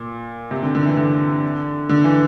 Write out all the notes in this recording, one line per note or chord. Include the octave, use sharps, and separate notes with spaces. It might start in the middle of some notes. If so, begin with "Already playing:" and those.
Already playing: A#2
C3
D3
D3
E3
D3
D3
E3